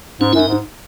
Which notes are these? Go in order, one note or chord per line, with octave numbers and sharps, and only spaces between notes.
G#2 C#4
F#2 E4
D#4
G#2